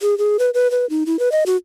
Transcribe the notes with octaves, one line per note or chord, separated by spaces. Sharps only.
G#4
G#4
B4
B4
B4
D#4
E4
B4
D#5
F#4